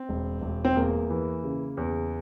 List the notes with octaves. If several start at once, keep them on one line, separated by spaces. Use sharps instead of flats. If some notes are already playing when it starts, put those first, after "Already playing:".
Already playing: C4
E1
E1
C4
E2 A#3
E3
C#3
E2